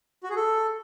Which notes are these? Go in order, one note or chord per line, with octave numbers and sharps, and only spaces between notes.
F#4
G#4
A4